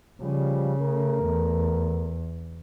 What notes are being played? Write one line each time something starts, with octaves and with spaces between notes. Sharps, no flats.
C#3 F3 G3
A3 A#4
E2